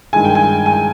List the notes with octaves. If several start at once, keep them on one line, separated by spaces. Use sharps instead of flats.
G2 D#3 G#3 G#5
G5
G#5
G#5